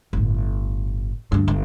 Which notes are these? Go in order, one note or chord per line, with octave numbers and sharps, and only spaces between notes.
G1 A2
D2 G2
G1